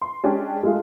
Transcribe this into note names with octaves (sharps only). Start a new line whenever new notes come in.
C6
G#3 C#4 D4 G4
G#3 A3 F4 G#4